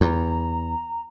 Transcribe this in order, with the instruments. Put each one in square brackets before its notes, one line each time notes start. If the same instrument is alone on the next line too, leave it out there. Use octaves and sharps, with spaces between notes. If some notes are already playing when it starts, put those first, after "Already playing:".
[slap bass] E2 [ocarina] A#5